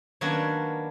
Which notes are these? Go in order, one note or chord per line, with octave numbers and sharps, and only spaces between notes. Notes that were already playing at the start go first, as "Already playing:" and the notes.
D#3 F#3 A#3 B3 C#4 D4